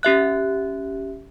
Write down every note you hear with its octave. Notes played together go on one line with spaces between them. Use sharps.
C#4 G4 E5 F#6